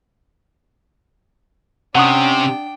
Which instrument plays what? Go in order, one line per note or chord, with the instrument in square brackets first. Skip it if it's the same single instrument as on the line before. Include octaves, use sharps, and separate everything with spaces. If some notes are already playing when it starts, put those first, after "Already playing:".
[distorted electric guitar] C3 [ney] C#4 [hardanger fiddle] D4 G5 [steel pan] F#5 C#6 D#6